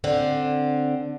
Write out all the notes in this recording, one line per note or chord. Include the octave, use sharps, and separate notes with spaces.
D3 C4